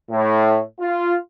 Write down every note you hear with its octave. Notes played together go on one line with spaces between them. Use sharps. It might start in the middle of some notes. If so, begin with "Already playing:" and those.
A2
F4